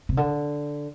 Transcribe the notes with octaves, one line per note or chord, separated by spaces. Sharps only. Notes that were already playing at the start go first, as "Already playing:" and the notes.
C3
D3